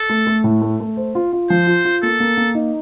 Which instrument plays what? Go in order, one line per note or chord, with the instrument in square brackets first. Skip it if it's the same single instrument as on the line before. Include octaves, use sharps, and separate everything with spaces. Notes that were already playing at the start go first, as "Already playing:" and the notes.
Already playing: [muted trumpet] A4
[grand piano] A3
A3
A2
A3
A3
C5
F4
F4
[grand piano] F3 [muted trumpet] C5
[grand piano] F4
F4
[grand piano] A#3 [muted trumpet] A4
[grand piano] A#3
A#3
D#4